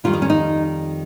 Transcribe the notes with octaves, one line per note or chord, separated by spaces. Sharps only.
F2 D#3 G3 F4
D#4
C#4
D#4